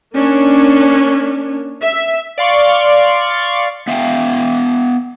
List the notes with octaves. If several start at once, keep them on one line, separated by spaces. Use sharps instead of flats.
A#3 C#4 D4
E5
D5 F5 C6 C#6
B3 E5 F5 G5